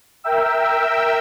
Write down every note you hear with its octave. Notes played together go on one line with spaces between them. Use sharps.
A#4 E5 G5 E6